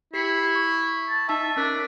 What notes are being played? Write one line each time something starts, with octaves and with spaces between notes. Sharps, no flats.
E4 G4 C7 C#7
C#6
A5
D#4 E5 A5
C#4 D4 A#4 B6